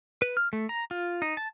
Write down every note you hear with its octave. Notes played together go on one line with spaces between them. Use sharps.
B4
F6
A3
A#5
F4
D#4
A5